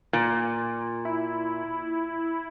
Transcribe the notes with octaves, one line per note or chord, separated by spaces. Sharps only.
A#2
E4